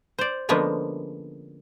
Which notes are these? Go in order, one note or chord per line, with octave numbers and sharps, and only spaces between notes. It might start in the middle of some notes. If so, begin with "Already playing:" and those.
C5 D5
D3 F3 G#3 A#3 B3 C#4